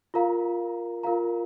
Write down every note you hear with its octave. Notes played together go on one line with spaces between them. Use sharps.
F4 A#4 F5 A#5
F4 A#4 F5 A#5